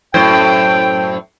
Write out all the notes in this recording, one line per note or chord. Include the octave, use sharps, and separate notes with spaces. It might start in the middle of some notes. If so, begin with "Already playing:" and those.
F#2 A2 C5 G5